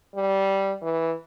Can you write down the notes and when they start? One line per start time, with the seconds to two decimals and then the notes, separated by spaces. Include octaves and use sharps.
0.15 G3
0.82 E3